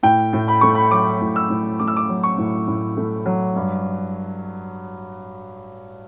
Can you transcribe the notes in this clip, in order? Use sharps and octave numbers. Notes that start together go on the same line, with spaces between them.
A2 G5
A2
B5
A3 C#6
B5
F#3 D6
A2
E6
A2
A3 D6
E6
D6
F#3
C#6
A2
A2
A3
F#3
G2